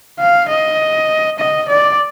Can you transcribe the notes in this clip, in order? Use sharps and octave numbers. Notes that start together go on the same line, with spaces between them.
F5
D#5
D#5
D5